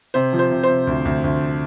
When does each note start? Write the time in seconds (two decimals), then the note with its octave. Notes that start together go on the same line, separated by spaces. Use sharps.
0.14 C3 C5
0.33 F3
0.39 C5
0.51 C3
0.63 C5
0.69 C3
0.87 D2
1.05 D2
1.24 D2